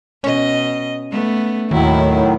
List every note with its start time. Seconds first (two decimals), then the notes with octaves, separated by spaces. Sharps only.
0.24 B2 C#4 D#5
1.11 A3 B3
1.71 D#2 A2 D#3 F#3 E4